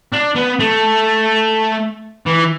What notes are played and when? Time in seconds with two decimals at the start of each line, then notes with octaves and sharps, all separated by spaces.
0.13 D4
0.36 B3
0.59 A3
2.26 E3